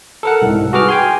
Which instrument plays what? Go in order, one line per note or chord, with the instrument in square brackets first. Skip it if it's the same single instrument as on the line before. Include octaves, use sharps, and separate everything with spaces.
[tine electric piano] A4 A#4 F#5
C2 G#2
F#4 G#4 B4 D6 F6
G5 G#5 C6